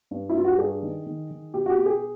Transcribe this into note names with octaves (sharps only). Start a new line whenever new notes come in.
G2
E4
G2 F4
F#4
G4
G2 G#4
D#3
D#3
D#3
B2 G4
F#4
G4
B2
G#4